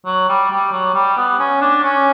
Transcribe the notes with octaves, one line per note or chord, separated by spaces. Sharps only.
F#3
G3
G3
F#3
G3
B3
C#4
D4
C#4